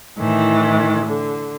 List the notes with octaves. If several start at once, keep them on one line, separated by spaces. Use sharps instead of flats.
A2 D#3 E3
D3